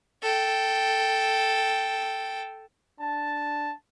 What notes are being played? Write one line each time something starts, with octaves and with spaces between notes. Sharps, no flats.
A4 G5
D4 A5